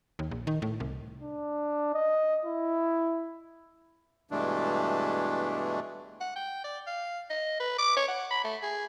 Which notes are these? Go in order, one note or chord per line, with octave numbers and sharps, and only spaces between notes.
D#2
A#1
D#3
A2
C2
D4
D#5
E4
G2 B2 E3 G#3 A3 D4
F#5
G5
D5
F5
D#5
B4
D6
C#5
F#5
B5
A3
G#4